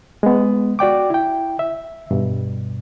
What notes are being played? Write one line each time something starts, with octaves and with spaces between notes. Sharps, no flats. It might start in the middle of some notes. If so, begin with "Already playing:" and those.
G#3 B3
F#4 D5 G5 D6
E4 G5
E5
G2 B2